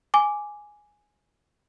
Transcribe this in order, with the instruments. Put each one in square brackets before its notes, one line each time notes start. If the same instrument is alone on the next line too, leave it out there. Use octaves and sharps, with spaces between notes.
[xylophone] G#5 D6